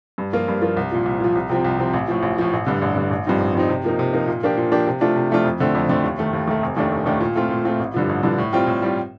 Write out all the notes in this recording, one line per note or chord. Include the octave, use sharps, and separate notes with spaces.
G2
F3 A#3 F4
G2
F3 A#3 F4
C2
A#2 F3
C2
A#2 F3
C2
C3 F3 C4
C2
C3 F3 C4
A1
A2 F3
A1
A2 F3
A1
G2 D3
A1
G2 D3
A1
G2 F3 C4 D#4
A1
G2 F3 C4 D#4
C3
F3 A#3 D#4
C3
F3 A#3 D#4
A#2
F3 A#3 D4 G4
A#2
F3 A#3 D4 G4
C3
F3 A3 D4 F4
C3
F3 A3 D4 F4
F2
D3 A3 C4
F2
D3 A3 C4
D#2
D#3 A3
D#2
D#3 A3
F1
D#2 D#3 A3 D4
F1
D#2 D#3 A3 D4
A#2
A3 C4 F4
A#2
A3 C4 F4
A1
G2 D3 F3
A1
G2 D3 F3
A2
G3 C4 F4
A2
G3 C4 F4